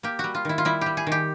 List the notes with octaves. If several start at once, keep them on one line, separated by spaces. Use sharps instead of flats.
A#3 G4
G3 F#4
F4
D#3 E4
F4
G3 E4
G3 G4
G#4
D#3
G4